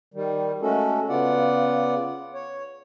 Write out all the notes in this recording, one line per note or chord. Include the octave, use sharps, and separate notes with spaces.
D#3 G3
G#3 A3 C#4 F#4 A4
C#3 B3 F4 D5 F#5
C#5